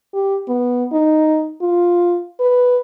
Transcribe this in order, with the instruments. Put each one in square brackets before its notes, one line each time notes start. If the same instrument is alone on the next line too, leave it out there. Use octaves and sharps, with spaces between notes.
[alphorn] G4
B3
D#4
F4
B4